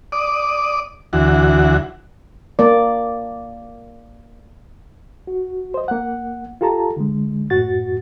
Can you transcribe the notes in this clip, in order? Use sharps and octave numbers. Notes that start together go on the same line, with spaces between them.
D5 D6 D#6
D2 E3 F#4
A#3 D5
F#4
C5 D#5
A#3 F#5
F4 G4 A4 A5 A#5
D3 G#3
F#2 A2 F#4 A6